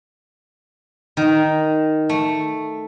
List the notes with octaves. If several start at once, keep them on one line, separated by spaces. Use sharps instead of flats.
D#3
A3